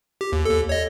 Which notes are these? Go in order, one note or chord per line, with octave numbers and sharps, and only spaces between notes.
G4
D#2
D#2 A4
C#5 D#5